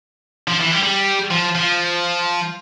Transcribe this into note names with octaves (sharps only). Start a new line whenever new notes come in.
F3
E3
G3
G3
F3
F3